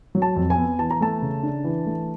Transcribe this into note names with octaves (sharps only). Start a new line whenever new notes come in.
F#3
A5
F2
G#5
B3
E3 A5
A#5
A3 A5
C#3
D4
E3
A3